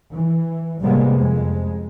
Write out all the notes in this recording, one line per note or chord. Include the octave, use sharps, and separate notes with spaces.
E3
A2 C3 G3 G#3 A#3 B3
F2 G#3